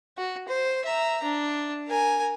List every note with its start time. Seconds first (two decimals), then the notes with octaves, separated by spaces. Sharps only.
0.18 F#4
0.48 C5
0.85 E5 A#5
1.23 D4
1.87 A#4 G#5